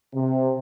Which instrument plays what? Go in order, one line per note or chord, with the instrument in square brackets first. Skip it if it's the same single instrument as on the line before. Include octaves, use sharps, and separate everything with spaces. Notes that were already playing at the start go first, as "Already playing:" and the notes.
[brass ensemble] C3